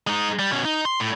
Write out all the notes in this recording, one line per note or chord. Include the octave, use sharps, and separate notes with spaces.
G#3 D#4
G3
B2 C#4
D#4
C6
A2